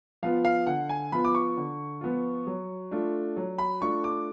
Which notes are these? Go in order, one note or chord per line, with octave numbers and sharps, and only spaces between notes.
F3 B3 F4 F5
F5
D3 F#5
G#5
F3 B3 F4 B5
D6
C#6
D3
F3 B3 F4
F#3
A3 D4 F4
F#3
B5
A3 D4 F4 C#6
D6